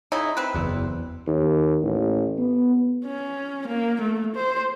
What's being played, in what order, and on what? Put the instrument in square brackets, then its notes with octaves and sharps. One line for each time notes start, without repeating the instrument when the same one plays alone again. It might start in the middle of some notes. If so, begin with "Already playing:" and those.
[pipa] C#3 D#4 E4
C4 B4
[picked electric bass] F#1 E2
[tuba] D#2
A1
B3
[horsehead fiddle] C#4
A#3
A3
C5